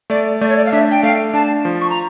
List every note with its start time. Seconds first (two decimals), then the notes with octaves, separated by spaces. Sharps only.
0.10 A3 D5
0.41 A3 D5
0.49 C#5
0.57 D5
0.66 F5
0.72 D4 E5
0.91 G5
1.03 A3 F5
1.34 D4 A5
1.65 F3
1.81 C#6
1.90 A#5